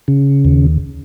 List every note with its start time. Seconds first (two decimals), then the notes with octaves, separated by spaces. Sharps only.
0.08 C#3
0.45 D#2